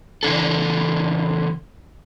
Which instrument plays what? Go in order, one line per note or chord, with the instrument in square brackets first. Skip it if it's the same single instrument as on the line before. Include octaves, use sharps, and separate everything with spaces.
[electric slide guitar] C#3 E3 D4 A4